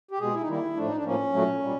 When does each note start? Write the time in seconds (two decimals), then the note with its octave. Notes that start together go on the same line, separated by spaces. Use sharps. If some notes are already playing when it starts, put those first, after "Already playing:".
0.11 G4
0.20 B2 G#3 G#4
0.34 E4
0.41 D#4
0.47 D#3 G3 A#3 E4
0.76 A2 F3 A3 D4
0.88 D#4
0.96 D4
1.04 A2 F3 A#3 C#4
1.33 A#2 F#3 A3
1.62 A#2 G3